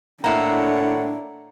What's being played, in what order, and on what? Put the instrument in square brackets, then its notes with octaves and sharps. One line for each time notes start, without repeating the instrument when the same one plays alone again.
[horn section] A2 F#5 [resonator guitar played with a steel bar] A#3 E4 [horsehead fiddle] D4 [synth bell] A#5